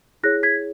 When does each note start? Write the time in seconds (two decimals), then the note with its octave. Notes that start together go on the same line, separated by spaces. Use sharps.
0.23 E4 G#4 C#5 F#6 A#6
0.43 G#6 B6